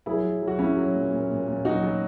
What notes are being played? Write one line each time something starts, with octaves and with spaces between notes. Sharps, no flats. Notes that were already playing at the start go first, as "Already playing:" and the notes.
F#3 E4 G#4
F#3
F#3
F#4
F#3 C#4 E4
F#3
A#2
A#2
A#2
A#2
F#3 D#4 F#4
F#3